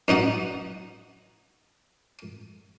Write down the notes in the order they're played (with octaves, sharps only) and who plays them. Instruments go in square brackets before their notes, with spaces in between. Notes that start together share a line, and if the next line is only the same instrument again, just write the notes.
[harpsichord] F#2 D#4 F#4 F#5